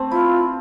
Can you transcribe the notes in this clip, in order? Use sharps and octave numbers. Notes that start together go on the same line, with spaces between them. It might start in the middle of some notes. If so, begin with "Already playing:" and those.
Already playing: A3 C4
E4 F4